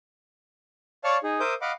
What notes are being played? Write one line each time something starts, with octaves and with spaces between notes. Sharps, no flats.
C#5 D5 F5 A5 C#6 F6
D#4 G#4
A#4 C5 E5 D6 D#6 G6
D#5 F5 F#5 B5 D6